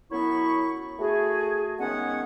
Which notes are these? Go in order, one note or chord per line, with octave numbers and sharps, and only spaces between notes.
F#2 F#3 B3 E4 B5 C#6
A3 F#4 G#4
D#3 G#3 B3 C#4 C#5 F#5